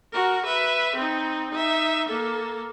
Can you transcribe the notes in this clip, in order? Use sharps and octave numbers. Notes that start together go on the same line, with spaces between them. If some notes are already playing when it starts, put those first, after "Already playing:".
F#4 A#4
B4 E5
C4 D#4
D#4 E5
A#3 A4